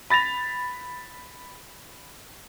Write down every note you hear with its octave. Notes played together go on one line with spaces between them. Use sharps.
B5 A6 A#6 F7